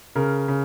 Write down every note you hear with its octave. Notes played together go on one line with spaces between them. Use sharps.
C#3 A#4
C#3